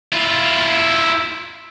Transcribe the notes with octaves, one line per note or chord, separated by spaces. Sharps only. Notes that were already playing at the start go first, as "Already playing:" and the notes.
E4 F4